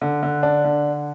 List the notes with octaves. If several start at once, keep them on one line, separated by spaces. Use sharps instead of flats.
D3
D3
D4
D3